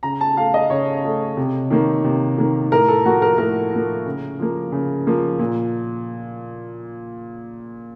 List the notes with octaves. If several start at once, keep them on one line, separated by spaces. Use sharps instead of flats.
C#3 A#5
A5
A3 F5
D#5
C#3 C#5
A3
C3
D#3 A#3
C3
D#3 A#3
A2 A#4
A4
F3 A#3 F#4
A#4
A2 A#4
F3 A#3
C#3
F3 A#3
C#3
F3 A#3
A#2